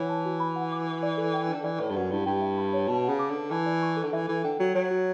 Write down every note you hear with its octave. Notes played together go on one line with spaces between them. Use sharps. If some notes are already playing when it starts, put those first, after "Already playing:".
Already playing: E3 C#5 F#5
A5
F#4
B5
F#5
D6
B4
D5
A4
G5
D3 D4
E3 D5
A2 B4
G2
F#2 F#5
G2 E4
G2 G5
E5
B5
C#5
B2 A5
C#3 F#5
D6
D3
B4
E3 A5
D5
C#6
A4
D3
E3 E5
E3 A4
D3 G5
F#3 F#4
F#3 C#5
F#4